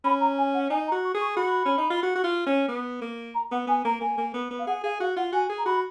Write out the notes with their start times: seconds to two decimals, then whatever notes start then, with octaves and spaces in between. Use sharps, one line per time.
0.04 C#4 B5
0.20 A#5
0.38 G#5
0.54 F#5
0.70 D#4 G#5
0.87 A#5
0.92 F#4
1.04 C#6
1.15 G#4
1.20 C#6
1.37 F#4 B5
1.65 C#4
1.78 D#4
1.91 F4
2.03 F#4
2.15 F#4
2.24 F4
2.46 C#4
2.68 B3
3.02 A#3
3.34 A#5
3.52 B3 F#5
3.67 B3 G#5
3.85 A#3 A#5
4.01 A#3 G#5
4.18 A#3
4.34 B3
4.51 B3
4.59 F5
4.67 G#4 F#5
4.84 G#4 F5
5.00 F#4 F5
5.17 F4 F#5
5.33 F#4 G#5
5.49 G#4
5.58 A#5
5.66 F#4 B5